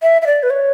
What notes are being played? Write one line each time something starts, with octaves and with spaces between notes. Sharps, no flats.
E5
E5
D5
B4
C#5